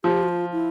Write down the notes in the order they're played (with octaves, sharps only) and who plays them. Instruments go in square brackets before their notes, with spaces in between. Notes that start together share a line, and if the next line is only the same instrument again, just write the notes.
[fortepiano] F3 [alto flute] G4
[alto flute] F#4
F4
E4